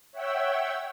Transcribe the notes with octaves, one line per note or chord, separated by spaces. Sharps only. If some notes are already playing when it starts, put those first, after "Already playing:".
C#5 E5 F#5 G5 E6